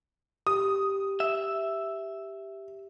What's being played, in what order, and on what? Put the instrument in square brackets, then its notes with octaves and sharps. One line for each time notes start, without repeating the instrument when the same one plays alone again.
[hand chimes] G4 [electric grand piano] D#6
[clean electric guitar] E5